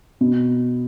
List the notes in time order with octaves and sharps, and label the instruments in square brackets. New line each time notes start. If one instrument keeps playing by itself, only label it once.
[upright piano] B2